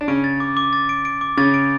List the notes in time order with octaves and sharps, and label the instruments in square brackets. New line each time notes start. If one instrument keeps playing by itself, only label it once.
[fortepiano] D4
[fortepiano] C#3 C#4 [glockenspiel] D7
[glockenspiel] A6
D6
D6
A6
D7
D7
D6
[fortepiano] C#3 C#4 [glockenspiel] A6
[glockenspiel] D7